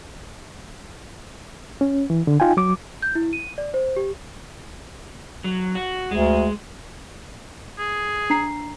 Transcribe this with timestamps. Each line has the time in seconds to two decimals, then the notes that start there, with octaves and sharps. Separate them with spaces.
1.81 C#4
2.10 E3
2.27 D3
2.40 D#4 F4 G5 G#5
2.57 F#3 D6
3.02 G6
3.15 E4
3.33 D#7
3.58 D5
3.74 C5
3.96 G4
5.44 F#3
5.75 F#4
6.11 D2 G#3
7.79 G#4
8.30 D4 A#5 C7